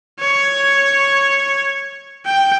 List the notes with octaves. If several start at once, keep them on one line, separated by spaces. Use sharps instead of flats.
C#5
G5